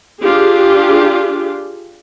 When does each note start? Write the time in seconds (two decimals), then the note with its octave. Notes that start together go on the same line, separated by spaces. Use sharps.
0.21 D4 F4 G4 G#4